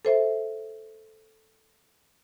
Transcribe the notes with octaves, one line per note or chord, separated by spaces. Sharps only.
A4 C5 E5